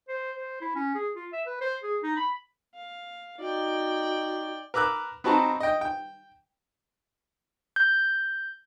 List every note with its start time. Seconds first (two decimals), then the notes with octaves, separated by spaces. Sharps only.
0.08 C5
0.37 C5
0.61 E4
0.75 C#4
0.95 G#4
1.16 F4
1.32 E5
1.46 B4
1.61 C5
1.83 G#4
2.03 D#4
2.17 B5
2.75 F5
3.40 D#4 F#4 D5 G5
4.74 A#4 B4 D6 E6 F#6
5.24 B3 C4 D#4 F#4 A5 A#5
5.60 D#5 G5
5.81 G5
7.76 G6